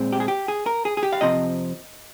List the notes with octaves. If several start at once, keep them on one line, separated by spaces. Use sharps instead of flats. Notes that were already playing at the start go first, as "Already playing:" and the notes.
Already playing: A#2 G#3 C4
G4
G#4
G4
G#4
A#4
G#4
G#4
G4
F5
F2 C3 F3 C4 D#5